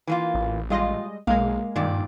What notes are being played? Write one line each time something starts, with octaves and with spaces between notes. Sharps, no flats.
E3 A#3 F4
A1
A#2 G3 G#3 F4 D#5
B1 G#3 A#3 F5
G2 A#2 D#3 D5